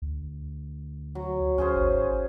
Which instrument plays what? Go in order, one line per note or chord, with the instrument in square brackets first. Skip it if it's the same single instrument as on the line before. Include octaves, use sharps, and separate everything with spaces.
[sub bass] D2
[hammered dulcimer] F#3
[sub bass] D2 [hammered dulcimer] C#4 G#4 C5
[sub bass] G#1